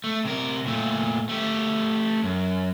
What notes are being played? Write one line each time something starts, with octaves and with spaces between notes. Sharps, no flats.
A3
C3 A#4
A#2 A3
A3 G4
F#2